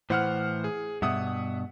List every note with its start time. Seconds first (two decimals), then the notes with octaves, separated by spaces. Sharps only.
0.10 A2 E3 C5 F#5 F6
0.64 G#4
1.02 G2 B2 E5 F#5 D#6